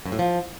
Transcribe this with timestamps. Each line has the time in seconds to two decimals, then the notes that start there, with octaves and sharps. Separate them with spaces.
0.06 F#2
0.12 A2
0.19 F3